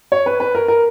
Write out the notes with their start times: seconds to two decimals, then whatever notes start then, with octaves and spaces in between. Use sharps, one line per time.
0.12 C#5
0.26 B4
0.40 B4
0.55 A#4
0.68 A#4